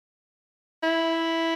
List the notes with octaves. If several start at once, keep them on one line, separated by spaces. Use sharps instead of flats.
E4